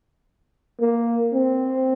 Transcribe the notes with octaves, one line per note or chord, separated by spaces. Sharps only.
A#3
C4